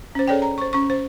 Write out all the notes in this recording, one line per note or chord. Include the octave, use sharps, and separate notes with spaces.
C#4 C5
C#4 G#4 A4 C#5 D5 G5
A#5
C5 C#6
C#4 C#6
C5